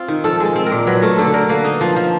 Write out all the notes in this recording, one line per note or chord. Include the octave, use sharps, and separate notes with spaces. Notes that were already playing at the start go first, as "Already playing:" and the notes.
Already playing: C4 F4
D#3
F3 A4
G#3 A4
C4
A#4
A#2
F#3 B4
A3 A#4
D3 A4
D3 A#4
A#3 B4
D#4
F3
F3